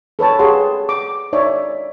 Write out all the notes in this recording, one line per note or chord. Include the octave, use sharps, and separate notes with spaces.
A4 B4 C#5 A5
G4 G#4 C#5 F5 F#5 C6
D6
D#4 C#5 D5 E5